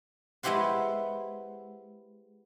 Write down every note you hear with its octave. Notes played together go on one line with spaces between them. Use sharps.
G#3 B3 E4 G4 C5 F#5